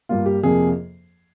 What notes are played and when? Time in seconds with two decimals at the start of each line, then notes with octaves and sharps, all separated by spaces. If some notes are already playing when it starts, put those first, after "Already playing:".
0.09 G2 G3 A#3 F4
0.26 G4
0.43 F2 C3 F3 A#3 G#4